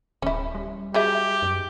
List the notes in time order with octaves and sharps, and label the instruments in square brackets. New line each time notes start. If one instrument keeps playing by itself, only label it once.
[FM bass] D1 [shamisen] C#4 E4
[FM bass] G3
[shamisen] F#3 G#4 E5 [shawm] G4
[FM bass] F#2